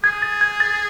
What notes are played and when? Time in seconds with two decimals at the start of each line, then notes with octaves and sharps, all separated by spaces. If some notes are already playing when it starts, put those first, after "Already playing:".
0.04 G#4 G#6
0.22 A6
0.41 G#6
0.60 A6